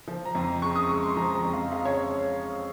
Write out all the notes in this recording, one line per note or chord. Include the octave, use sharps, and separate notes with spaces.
F3
A#5
F2
A#5
C#3 C#6
D#6
G#3 C#6
C6
F3 A#5
A#5
F2
F5
C#3 F5
C#5